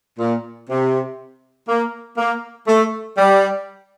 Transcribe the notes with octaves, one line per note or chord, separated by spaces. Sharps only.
A#2
C3
A#3
A#3
A3
G3